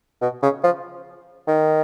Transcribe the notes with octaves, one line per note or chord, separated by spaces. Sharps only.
B2
C#3
F3
D#3